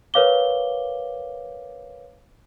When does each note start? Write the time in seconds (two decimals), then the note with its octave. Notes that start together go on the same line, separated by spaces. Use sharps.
0.14 A#4 B4 C#5 F5 D6 G7